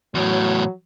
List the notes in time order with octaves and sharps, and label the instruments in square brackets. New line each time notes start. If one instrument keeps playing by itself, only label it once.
[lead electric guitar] E2 A2 [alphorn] F#3